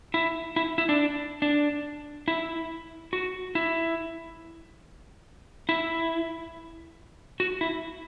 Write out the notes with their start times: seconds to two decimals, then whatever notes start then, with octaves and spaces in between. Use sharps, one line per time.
0.14 E4
0.56 E4
0.78 E4
0.89 D4
1.42 D4
2.28 E4
3.13 F#4
3.55 E4
5.69 E4
7.40 F#4
7.61 E4